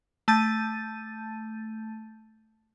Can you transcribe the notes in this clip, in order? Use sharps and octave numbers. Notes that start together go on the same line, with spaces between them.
A3 A5 G6 A6 D#7